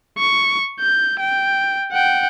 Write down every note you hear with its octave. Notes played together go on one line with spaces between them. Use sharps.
C#6
G6
G5
F#5 G5